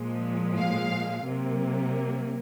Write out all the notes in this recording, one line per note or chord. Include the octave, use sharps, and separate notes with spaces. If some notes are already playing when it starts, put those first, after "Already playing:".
Already playing: A#2 F3 G#3
F5
C3 F#3 A#3